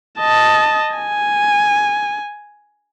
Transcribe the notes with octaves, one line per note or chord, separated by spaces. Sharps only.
D#5 A5
G#5